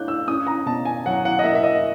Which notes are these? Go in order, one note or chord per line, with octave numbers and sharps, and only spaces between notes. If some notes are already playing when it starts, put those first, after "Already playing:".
Already playing: A3 D4 F#6 G6
E6
C#4 D#6
A#5
B2 A5
G#5
F#3 F#5
F#5
D#5
A#3 E5
E5
D#5